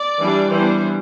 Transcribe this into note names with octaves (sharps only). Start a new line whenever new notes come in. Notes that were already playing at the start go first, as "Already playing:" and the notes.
Already playing: D5
E3 G3 D4
E3 G3 B3 D4 C5